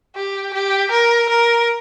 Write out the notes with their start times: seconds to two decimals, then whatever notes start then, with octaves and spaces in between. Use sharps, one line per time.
0.15 G4
0.54 G4
0.92 A#4
1.30 A#4